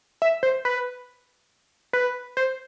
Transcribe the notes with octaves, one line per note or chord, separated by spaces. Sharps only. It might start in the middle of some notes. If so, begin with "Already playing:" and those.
E5
C5
B4
B4
C5